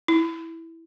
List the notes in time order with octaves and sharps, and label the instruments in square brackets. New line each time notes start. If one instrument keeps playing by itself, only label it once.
[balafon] E4